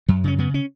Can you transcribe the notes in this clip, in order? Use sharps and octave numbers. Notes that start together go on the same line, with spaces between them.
F#2 F#3
C#3 C#4
C#3 B3
C#4